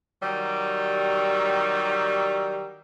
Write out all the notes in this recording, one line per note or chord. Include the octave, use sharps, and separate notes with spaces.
D#3 F#3 G3